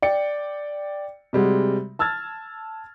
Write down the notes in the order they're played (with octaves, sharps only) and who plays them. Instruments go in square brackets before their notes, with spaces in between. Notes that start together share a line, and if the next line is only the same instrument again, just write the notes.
[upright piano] D5 G5 C#7
C3 G3 G#3 F#4
A5 E6 F6 G#6 A6